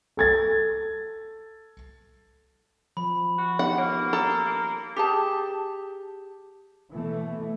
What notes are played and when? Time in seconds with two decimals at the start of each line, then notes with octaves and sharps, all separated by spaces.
0.17 A4 G#6 A6
2.97 F3 B5
3.38 F#4
3.59 G#3 B3 D#4 G4 F#5
3.78 A#3 C#5
4.13 A4 A#5
4.96 G4 G#4 A5
6.93 B2 E3 A3